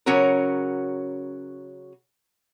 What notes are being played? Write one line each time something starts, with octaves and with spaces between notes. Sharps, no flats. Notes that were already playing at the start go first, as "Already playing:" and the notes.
C#3 F#3 C#4 F#4 A#4